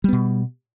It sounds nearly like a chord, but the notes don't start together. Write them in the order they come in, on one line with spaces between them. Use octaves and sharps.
G3 B3 B2